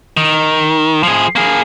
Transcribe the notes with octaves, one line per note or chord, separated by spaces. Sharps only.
D#3
F3 G#4
A#3 G#4